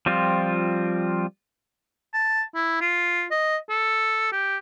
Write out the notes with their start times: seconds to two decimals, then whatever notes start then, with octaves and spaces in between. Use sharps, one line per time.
0.06 F3 G3 C4 F4
2.14 A5
2.55 E4
2.81 F4
3.31 D#5
3.70 A4
4.33 G4